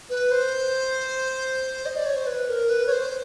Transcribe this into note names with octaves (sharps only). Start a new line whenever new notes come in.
B4
C5
D#5
D5
C#5
C5
B4
A#4
B4
C#5
C5